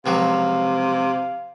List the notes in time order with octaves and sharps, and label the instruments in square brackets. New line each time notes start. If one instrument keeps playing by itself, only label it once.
[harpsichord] C#2 F3 F#3 [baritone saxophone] C3 [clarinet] F5